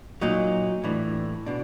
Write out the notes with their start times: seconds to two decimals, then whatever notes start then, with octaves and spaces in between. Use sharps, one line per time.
0.21 A#2 F#3 D#4
0.84 A2 E3 D4
1.46 B2 D4